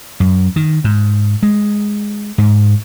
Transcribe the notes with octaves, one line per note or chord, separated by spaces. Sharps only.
F#2
D#3
G#2
G#3
G#2